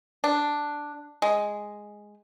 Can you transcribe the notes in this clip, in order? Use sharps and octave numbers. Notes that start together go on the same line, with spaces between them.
D4
G#3